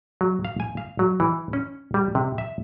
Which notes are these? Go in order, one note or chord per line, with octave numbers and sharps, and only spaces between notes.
F#3
F5
G#5
F5
F#3
E3
C#4
G3
C3
E5